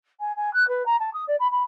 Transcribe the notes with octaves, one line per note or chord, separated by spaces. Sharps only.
G#5
G#5
F#6
B4
A#5
A5
D#6
D5
B5
B5